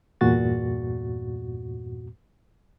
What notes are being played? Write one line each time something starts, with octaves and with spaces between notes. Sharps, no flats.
E2 G2 A#2 F#4 A6